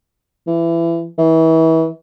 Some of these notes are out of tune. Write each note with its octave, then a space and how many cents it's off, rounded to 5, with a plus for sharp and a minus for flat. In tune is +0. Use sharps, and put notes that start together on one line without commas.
E3 +25
E3 -30